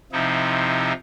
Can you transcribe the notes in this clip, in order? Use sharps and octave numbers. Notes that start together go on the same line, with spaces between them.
C3 F3 D#4 E4